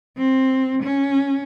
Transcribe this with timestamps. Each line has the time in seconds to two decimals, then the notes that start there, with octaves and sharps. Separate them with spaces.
0.18 C4
0.82 C#4